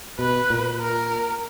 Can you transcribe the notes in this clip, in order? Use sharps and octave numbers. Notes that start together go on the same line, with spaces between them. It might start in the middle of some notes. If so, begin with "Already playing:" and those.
B2 B4
A#2
A#4